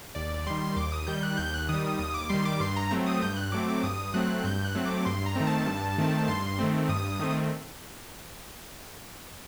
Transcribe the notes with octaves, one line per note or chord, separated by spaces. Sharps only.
D#2 D5
D#3 G3 C6
D#2 D6
D#6
D#3 G3 G6
F#6
D#2 G6
F#6
D#3 G3 D#6
D#6
D#2 D#6
D6
D#3 G3 C6
D6
G2 C6
A#5
F#3 A3 C4
D#6
G2 G6
F#6
F#3 A3 C4 D6
D6
G2 D#6
F#3 A3 C4 F#6
G2 G6
F#6
F#3 A3 C4
D6
G2 C6
A#5
D#3 A3 C4
A5
G2
D#3 A3 C4
G2 C6
D#3 A3 C4
G2 D#6
D#6
D#3 A3 C4